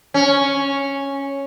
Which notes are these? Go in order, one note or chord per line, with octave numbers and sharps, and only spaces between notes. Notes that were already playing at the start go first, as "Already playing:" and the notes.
C#4